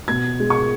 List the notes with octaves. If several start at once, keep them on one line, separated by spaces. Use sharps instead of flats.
B2 G#6
G#3
C#6